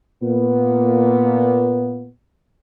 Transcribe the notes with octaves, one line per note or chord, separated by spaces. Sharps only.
A#2 A#3 B3